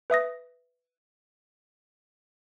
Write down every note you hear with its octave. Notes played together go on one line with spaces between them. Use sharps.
B4 E5 D#6 A#6